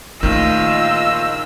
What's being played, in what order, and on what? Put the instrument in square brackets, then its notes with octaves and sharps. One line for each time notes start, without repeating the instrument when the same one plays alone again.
[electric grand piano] A#1 D#3 [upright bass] A3 A#3 [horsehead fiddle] F4 D#5 [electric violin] E6